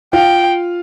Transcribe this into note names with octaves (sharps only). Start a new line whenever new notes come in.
F4 F5 G5